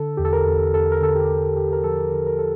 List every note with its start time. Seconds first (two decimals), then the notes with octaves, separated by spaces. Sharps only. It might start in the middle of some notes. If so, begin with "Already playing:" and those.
Already playing: D3 A4
0.17 E2 G4
0.25 A4
0.33 A#4
0.46 E2
0.74 E2 A4
0.92 A#4
1.01 D3 A4
1.15 G4
1.29 E2
1.56 E2 G4
1.73 A#4
1.84 F3 A4
2.12 D3
2.27 A#4
2.39 A4